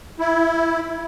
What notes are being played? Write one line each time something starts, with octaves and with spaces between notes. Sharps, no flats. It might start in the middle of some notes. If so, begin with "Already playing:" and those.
E4